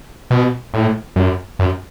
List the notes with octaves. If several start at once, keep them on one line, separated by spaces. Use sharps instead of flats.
B2
A2
F#2
F#2